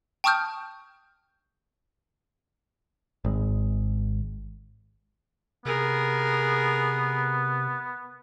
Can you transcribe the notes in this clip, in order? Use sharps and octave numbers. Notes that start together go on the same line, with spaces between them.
G5 A5 C#6 D#6 F6 G6
G#1 G#3
C3 B3 G#4 A#4